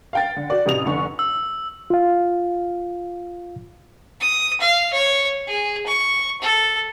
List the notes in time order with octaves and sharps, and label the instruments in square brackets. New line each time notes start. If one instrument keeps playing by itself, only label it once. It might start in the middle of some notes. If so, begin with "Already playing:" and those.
[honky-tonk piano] F5 G5 A6
D3
F#4 D5
A1 C3 D#6 F7
F1 D3 C#6
[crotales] E6
[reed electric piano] F4 F5
[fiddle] D#6
F5
C#5
G#4
C#6
A4